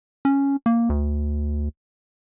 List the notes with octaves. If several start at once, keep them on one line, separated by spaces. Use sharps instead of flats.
C#4
A#3
D2